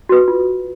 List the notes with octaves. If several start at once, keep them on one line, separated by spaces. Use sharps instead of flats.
F#4 B4
F4